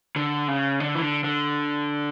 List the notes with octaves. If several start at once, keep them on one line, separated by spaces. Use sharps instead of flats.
D3
C#3
D3
E3
D3
D3